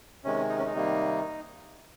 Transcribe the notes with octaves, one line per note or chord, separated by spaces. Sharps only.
C3 D#3 G#3 C#4
D#4
C#4
D#4
C3 D#3 G3 A#3